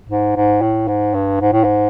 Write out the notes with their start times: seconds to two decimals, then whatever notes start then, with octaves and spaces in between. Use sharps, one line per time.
0.10 G#2
0.36 G#2
0.62 A2
0.88 G#2
1.14 G2
1.41 G#2
1.53 A2
1.64 G#2